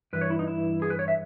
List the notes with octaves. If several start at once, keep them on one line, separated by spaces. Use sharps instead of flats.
G2 E3 B4
C#5
E4
D#4
E4
G#4
B4
C#5
E5